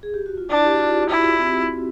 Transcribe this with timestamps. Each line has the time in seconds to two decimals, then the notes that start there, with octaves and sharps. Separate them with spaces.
0.03 G#4
0.14 G4
0.26 F#4
0.38 F4
0.50 D4 E4
0.65 G4
0.73 F#4
0.79 F4
1.10 E4
1.39 C4